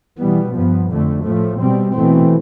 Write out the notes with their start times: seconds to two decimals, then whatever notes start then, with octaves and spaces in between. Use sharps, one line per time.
0.19 B2 E3 G3 B3
0.55 G2 F3 B3
0.89 F2 D3 A3
1.24 A2 F3 A3
1.59 B2 G3 C4
1.94 B2 E3 A3 C4